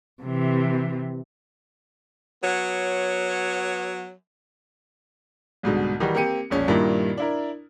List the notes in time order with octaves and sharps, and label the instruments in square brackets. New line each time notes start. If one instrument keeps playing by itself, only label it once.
[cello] C3 E3
[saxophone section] F#3 B3 C#5
[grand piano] C2 G#2 B2 D3
D#3 E3 G3 D#4 F#4
A#3 C4 G4 C#7 D#7
E1 A#1 C#4
G2 A#2 D#3 A#3 E4 F4
D4 E4 A#4